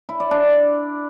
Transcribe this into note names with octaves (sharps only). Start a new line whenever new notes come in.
E4
D5
D4